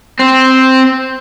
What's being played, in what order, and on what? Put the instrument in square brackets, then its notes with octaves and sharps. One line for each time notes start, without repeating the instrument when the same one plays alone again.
[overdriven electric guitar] C4